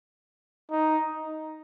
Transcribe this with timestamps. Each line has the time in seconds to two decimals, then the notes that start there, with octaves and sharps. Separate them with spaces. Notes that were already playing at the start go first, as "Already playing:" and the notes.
0.71 D#4